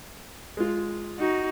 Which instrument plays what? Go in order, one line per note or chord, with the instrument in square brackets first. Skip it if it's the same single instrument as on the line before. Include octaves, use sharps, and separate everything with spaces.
[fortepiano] G#3 F4
[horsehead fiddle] D#4 F#4